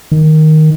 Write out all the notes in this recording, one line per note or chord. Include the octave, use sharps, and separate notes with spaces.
D#3